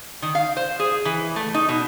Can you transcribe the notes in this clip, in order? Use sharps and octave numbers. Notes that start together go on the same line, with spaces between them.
D#3
F5
C5
G#4
E3
A3
D#4
B2